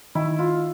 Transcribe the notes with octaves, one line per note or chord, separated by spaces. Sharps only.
D#3 E4
F4